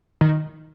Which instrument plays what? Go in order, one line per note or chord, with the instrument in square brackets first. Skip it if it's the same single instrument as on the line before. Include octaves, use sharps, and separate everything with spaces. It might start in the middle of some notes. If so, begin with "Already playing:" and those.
[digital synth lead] D#3